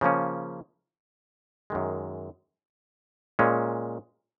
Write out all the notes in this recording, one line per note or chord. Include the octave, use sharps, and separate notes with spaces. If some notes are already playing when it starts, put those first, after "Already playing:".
C#3 F3 A#3 C#4
F#2 D#3 G#3
A#2 G#3 C#4